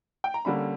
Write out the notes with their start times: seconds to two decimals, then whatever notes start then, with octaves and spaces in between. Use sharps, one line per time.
0.24 G5
0.34 A#5
0.45 D3 G3 A#3 C#4 B5